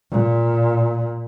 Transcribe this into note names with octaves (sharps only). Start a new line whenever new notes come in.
A#2